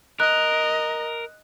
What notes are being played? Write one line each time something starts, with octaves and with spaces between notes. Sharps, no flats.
A#4 D#5 F#6